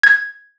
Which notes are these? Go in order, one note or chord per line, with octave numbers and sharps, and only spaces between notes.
G#6